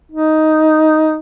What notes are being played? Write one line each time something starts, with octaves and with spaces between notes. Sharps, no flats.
D#4